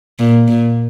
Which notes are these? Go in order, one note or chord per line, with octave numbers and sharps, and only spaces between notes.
A#2
A#2